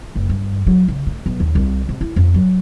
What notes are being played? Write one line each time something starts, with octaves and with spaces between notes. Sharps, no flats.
F#1
G2
F#3
C#3
A3
B1
D#2
C2
C3
E4
F2
F#3